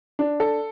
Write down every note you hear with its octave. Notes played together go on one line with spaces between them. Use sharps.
D4
A4